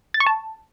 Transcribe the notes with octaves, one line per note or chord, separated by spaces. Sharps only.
A6
C#6
A5